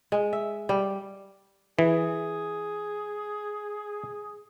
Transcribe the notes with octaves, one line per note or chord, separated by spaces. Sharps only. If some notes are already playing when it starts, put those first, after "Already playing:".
G#3
E5
G3
E3 G#4